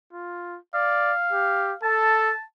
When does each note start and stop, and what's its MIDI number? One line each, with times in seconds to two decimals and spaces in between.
0.13 0.58 65
0.74 1.13 74
0.74 1.78 77
1.32 1.73 67
1.83 2.33 69
1.83 2.42 81